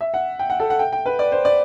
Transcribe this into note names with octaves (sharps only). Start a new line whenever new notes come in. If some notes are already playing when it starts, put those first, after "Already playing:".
E5
F#5
G5
F#5
A4
F#5
G5
G5
B4
D5
C5
D5